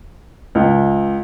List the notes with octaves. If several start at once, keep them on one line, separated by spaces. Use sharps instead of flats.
C#2